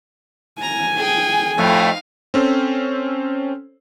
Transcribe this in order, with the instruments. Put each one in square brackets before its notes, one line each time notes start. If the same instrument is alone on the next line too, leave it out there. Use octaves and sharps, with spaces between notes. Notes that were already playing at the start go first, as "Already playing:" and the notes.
[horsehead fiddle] G#5 [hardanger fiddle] A#5
[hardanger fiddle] G#4 G5
[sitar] F2 A2 [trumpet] A3 [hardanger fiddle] D#4 F5
[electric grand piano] C4 C#4 A4 C5